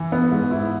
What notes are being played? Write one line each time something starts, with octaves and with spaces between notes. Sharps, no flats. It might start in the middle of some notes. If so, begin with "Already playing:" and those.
Already playing: E3
B3
G#2
E4